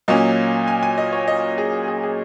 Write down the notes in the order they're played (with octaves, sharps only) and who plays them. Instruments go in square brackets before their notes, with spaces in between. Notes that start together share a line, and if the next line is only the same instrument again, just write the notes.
[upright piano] A#2 F#3 A#3 C#4 D#5
G#5
G#5
D#5
C#5
D#5
G#4
G#4
G#4